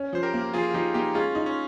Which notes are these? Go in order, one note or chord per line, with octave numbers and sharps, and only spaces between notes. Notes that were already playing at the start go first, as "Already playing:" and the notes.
Already playing: C#4
F3 C5
G4 A#4
A#3
F3 F4 G#4
F4
F3 D#4 G4
A#3 D#4 G4
G#3 C#4 F4
D#4
C#4